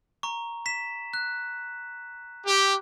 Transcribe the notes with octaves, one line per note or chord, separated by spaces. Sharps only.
A#5 C#6
B6 E7
F#6
G4